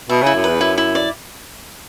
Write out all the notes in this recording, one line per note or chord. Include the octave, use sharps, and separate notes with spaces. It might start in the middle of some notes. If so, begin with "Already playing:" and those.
B2 E5
C#3 E4
F#2
E2 B4
F#2 E4
E4
D5